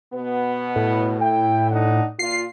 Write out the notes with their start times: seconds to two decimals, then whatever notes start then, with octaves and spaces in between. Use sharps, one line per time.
0.13 B2 B3
0.76 A2
1.22 E4 G5
1.70 D4 D#4 F#5
2.19 A#2 F4 C7